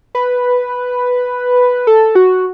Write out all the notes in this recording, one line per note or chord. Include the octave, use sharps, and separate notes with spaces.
B4
A4
F#4